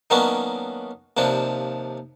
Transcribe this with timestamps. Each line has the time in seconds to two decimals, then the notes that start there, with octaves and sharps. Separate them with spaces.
0.10 D#3 F#3 A#3 B3 C#4 D4
1.17 D#2 C3 F3 D4